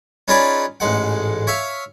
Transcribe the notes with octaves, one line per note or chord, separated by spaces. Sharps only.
C#4 D#4 F4 G#4 B4 D5
A1 G#2 G#3 F#5
C#5 E5 F5